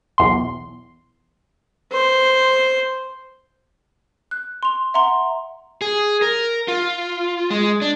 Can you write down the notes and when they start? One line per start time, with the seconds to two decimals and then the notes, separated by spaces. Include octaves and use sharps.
0.18 B1 E2 C6
1.93 C5
4.31 F#6
4.63 C6 F7
4.94 E5 F#5 A#5 C6
5.81 G#4
6.22 A#4
6.68 F4
7.50 G#3
7.82 D4